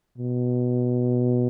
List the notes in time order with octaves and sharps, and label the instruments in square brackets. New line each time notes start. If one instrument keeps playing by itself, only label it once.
[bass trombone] B2